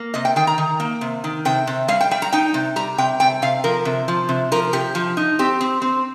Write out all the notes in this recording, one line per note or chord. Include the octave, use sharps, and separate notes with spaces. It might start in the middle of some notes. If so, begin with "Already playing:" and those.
Already playing: A#3
C3 D#5
G5
D#3 G5
A#5
D#3
A#3
C3
D#3
C3 G5
C3
G3 F5
G5
G3 G5
A#5
D#4 G5
C3
G3 A#5
C3 G5
C3 G5
C3 F5
F3 A#4
C3
F3
C3
F3 A#4
C3 G4
F3
D#4
C4 G4
C4
C4